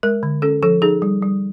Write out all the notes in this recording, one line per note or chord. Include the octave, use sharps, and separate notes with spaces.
G#3 A#4
D3
C#4 A4
F3 A4
D#4 G#4
G3
G3